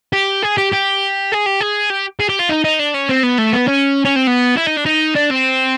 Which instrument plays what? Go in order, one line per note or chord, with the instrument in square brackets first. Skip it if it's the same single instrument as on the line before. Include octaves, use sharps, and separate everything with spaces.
[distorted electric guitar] G4
G#4
G4
G4
G#4
G4
G#4
G4
G#4
G4
F4
D#4
D#4
D4
C#4
C4
B3
A3
B3
C#4
C#4
C4
B3
E4
D#4
D4
D#4
D4
C4